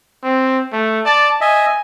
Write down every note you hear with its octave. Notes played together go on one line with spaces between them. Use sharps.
C4
A3
D5 A5
D#5 E5 G#5